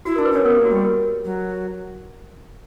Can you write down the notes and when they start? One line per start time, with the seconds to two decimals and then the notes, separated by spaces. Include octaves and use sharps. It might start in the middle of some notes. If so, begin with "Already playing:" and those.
0.05 E4 F#4
0.16 D4 A#4
0.25 B4
0.32 C#4 A#4 C#5
0.45 B3 A#4
0.55 A#3 G4
0.65 F#4
0.71 G3 G4
0.85 A#4
1.25 F#3